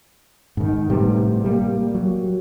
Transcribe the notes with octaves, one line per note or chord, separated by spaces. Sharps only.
G#2 D#3
A2 C3 G3 B3
G3 A3 A#3
F#3